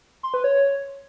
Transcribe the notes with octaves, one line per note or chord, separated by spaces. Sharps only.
C6
B4
C#5